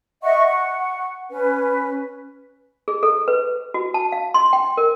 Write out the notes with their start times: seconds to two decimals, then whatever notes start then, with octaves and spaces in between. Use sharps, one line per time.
0.22 D#5 E5 F#5 C#6
0.47 F#5 C#6
1.30 C#4 B4
2.88 G#4
3.03 A4
3.28 B4
3.74 F#4
3.94 A5
4.12 F5
4.34 C6
4.53 G5
4.77 A#4